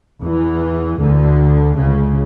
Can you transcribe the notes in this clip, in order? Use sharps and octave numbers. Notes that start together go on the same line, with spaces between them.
E2 E3
D2 D3
C#2 C#3